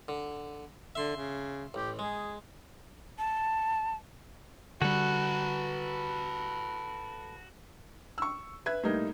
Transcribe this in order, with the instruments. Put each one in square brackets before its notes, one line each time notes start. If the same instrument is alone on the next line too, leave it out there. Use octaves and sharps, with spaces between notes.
[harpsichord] D3
[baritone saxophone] D3 [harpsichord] E5 C6
[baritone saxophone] C#3
[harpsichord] A1 [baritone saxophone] G4
[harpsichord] G#3 [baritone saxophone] G#4
[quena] A5
[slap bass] D3 G3 [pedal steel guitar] F#4 [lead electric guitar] A4 B4
[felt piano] C#6 E6
B4 E5 G#6
A2 G3 A#3 D#4